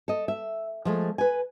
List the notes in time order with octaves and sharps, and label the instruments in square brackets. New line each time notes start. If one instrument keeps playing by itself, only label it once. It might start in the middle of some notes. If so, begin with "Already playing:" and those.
[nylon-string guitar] A4 D#5
E5
F3 G#3 A3
B4 G#5